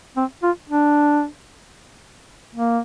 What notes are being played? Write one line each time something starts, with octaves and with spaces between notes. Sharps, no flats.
C4
F4
D4
A#3